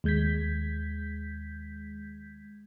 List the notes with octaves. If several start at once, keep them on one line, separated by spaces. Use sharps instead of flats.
D#2 G#3 G6 G#6 B6